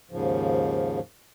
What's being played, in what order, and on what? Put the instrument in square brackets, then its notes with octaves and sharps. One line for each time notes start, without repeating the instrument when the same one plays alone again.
[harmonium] D#2 G#2 C#3 F3